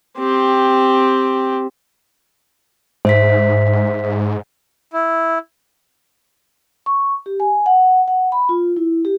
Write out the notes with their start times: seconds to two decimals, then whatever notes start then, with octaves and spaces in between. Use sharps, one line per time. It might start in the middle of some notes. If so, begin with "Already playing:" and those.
0.18 C4 G4
3.05 G#2 C5 E5 B6
4.93 E4
6.86 C#6
7.26 G4
7.40 G#5
7.66 F#5
8.08 F#5
8.32 B5
8.49 F4
8.77 E4
9.05 G4